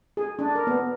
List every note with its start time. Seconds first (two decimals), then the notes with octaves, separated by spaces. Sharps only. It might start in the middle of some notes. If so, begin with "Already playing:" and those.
0.17 G#4
0.39 D4
0.55 A#4
0.67 B3